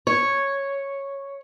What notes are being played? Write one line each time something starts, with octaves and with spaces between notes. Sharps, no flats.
C#5